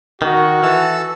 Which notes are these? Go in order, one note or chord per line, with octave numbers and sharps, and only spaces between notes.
D#3 F#4
E3 A4 A5 E6